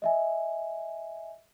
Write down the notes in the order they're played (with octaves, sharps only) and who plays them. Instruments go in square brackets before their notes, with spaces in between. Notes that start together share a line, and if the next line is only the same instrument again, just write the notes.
[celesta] D#5 E5 G#5